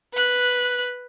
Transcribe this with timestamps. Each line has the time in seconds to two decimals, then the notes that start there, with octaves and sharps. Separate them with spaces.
0.14 B4 F#6